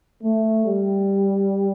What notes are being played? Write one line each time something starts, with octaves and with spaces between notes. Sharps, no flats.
A3
G3